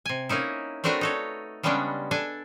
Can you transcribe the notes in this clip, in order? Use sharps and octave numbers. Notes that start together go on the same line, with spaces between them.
C3 G#5
A#3 C#4 D#4 E4
A3 C4 D4 F#4 A#4 B4
D#4 A4 C#5
C#3 G3 G#3 B3 C#4 D4
D4 A4 D5 G#5